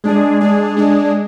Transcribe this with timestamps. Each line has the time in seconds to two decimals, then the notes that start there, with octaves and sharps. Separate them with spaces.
0.04 G#3 D4 G#4
0.41 G#3 D4 G#4
0.77 G#3 D4 G#4